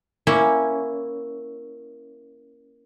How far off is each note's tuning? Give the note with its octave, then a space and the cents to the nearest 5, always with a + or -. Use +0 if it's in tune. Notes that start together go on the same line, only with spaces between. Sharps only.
A#3 +10 C#4 +0 E4 +0